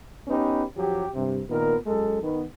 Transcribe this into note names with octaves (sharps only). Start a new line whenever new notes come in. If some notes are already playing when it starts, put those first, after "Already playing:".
B3 C#4 D#4 G4 B4
F#2 F3 F#3 G4
G2 C3
A#2 D#3 B3 A#4
F#2 G#3 A4
D#3 B3